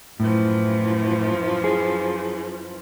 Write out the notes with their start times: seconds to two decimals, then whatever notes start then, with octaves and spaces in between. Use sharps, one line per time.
0.20 F#2 A2 E3 F3
1.64 G#4